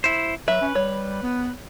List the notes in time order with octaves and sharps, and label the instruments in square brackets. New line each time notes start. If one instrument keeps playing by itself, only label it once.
[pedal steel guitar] E4 C5
[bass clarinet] F#3 [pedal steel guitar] B4 [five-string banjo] E5
[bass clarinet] C#4
[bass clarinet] G3 [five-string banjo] C#5
[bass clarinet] B3